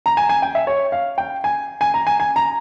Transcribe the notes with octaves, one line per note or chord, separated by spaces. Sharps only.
A#5
G#5
G#5
G5
E5
C#5
F5
G5
G#5
G#5
A#5
G#5
G#5
A#5